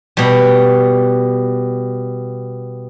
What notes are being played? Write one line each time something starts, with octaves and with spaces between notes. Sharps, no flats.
B2 G3